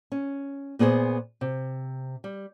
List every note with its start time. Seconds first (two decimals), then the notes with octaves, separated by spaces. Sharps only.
0.12 C#4
0.79 A#2 B3 G#4 A4 C5
1.41 C3
2.24 G3